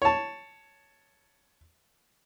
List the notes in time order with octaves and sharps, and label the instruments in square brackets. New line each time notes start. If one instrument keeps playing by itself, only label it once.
[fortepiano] C#5 A5